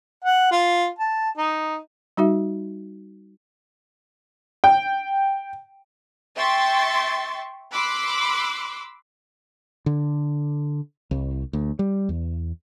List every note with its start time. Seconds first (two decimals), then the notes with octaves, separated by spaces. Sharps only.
0.24 F#5
0.52 F4
0.99 A5
1.38 D#4
2.17 G3 D#4 F#4 E5
4.64 G5
6.35 E5 G5 C6 C#6 A6
7.72 B5 C6 D6 E6 F#6
9.86 D3
11.11 C2
11.53 D2
11.79 G3
12.09 E2